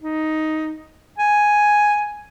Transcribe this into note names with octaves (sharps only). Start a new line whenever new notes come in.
D#4
G#5